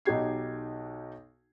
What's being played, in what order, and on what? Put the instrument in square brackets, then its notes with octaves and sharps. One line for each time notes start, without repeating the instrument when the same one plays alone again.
[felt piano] B1 D#4 F#4 G4 G#6 C7